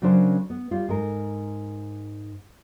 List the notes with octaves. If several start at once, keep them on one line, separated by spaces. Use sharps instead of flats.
C#3 F#3 C#4 D4 A#4 C5
B3
G3 F4
G#2 A#4